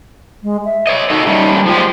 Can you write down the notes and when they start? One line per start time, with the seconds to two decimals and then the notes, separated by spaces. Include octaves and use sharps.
0.43 G#3
0.65 E5
0.87 C#5 D#5
1.10 D#4 F#4 A4 D#5
1.27 G3 A3 C#4
1.66 F3 G#3 F4 G4